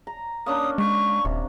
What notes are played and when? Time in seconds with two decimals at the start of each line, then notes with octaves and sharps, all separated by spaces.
0.07 A#5
0.46 A#3 C#4 D4 D#6
0.78 G#3 C#6
1.25 D#1 C3